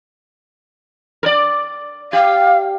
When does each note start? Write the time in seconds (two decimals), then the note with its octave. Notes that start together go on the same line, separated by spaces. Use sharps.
1.23 A#4 D5
2.13 G4 F5